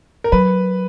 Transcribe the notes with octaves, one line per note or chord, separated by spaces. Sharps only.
A#4
F#3 B4